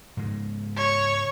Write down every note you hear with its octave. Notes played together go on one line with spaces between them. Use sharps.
G#2 C#3 G#3
C#5